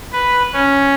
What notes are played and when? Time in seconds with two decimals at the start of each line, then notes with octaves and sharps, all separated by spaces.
0.13 B4
0.54 C#4